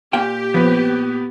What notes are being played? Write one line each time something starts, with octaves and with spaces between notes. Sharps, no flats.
A#2 G4 F5 G5
F3 B3 C4 B4